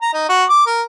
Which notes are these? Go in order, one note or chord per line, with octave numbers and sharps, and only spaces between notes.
A#5
D#4
F#4
D6
A#4